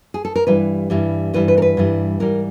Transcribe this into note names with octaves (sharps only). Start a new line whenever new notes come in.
G#4
A4
A#4
G2 E3 G3 B4
G2 E3 G3
G2 E3 G3 B4
B4
A#4
B4
G2 E3 G3
G#2 E3 G3 A#4